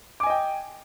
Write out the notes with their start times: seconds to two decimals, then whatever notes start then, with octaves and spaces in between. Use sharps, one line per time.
0.20 D6
0.23 G#5
0.27 D#5
0.30 G5